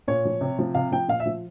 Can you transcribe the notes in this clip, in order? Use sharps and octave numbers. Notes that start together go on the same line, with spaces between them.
A#2 C#5
F3
C3
F3
C3 F5
F3 G5
A#2 F5
E5
F3